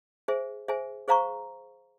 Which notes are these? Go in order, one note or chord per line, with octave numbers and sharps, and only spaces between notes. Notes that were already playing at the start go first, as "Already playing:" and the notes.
G#4 C5 E5 G#5
G#4 C5 E5 G#5
G#4 C5 F5 A#5 C#6